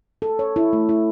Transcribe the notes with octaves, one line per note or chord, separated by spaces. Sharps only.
A4
C#5
E4
A3
E4